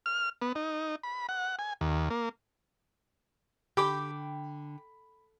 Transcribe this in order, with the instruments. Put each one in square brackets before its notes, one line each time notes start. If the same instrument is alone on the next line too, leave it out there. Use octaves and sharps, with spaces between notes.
[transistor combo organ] F6
B3
D#4
B5
F#5
G#5
D#2
A#3
[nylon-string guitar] D3 [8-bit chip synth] G4 [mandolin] G5 D6 G6 [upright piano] B5